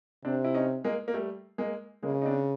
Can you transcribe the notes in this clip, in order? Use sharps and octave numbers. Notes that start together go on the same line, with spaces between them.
C3 C4 D4
E4
C#4 D#4
G#3 A#3
A#3
G3 A3
G#3 A#3
C#3 G#3 A#3
D#4
C4 D4